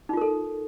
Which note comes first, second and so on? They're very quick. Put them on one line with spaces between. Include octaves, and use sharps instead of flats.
D#4 F4 A#4 A4